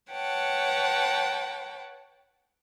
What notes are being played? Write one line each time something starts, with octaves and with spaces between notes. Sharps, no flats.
B4 C#5 F#5 G5 A5